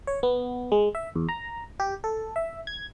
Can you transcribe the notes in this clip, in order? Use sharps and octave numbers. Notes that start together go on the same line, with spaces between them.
C#5
B3
G#3
E5
E2
A#5
G4
A4
E5
G#6